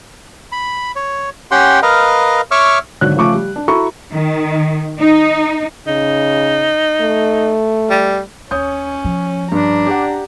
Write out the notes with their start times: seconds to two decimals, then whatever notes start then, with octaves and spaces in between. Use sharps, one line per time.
0.52 B5
0.96 C#5
1.51 C#4 G4 F#5 G5 C6
1.82 A#4 B4 D#5 F5
2.51 C#5 E5 C#6 D6 E6 F6
3.01 G#1 D3 F#3 D4 C#5 F#6
3.17 C#3 F3 A3 C#6 D6
3.34 G3
3.56 D4
3.68 E4 F#4 A4 A#5 C#6
4.11 D#3
5.00 D#4
5.87 C#3 D#4
7.01 A3
7.90 G3
8.51 D#2 C#4 C#5 D#6 G6
9.04 F3
9.52 G2 D4 A#5
9.87 G4 D5 F#5